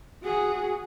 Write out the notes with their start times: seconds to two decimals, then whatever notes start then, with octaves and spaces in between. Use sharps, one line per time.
0.24 F#4 G#4